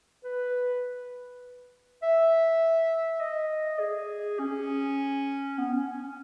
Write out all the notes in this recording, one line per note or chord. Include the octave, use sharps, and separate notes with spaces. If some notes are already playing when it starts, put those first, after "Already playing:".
B4
E5
D#5
G#4
C#4
B3
C#4
C#4
C#4